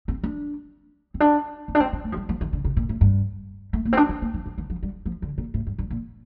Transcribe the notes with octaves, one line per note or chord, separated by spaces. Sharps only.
C4
D4
C4
D4
C4
D4
C4
C4
A3
F3
G3
F3
D#3
D3
C3
A#2
A2
G2
A3
A#3
C4
D4
D4
A#3
F3
F3
D#3
F3
G3
F3
D3
A#2
A2
G2
G2
A#2